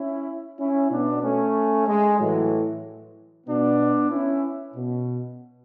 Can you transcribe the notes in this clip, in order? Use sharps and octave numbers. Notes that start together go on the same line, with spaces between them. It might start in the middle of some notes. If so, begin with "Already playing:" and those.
Already playing: C#4 E4
C#4 E4
B2 B3 D4
A3 C#4
G#3
A2 E3 F#3
B2 B3 D4
C#4 E4
B2